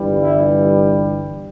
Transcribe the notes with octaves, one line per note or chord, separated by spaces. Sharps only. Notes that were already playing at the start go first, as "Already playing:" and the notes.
Already playing: G1 G2 E3 G3
E4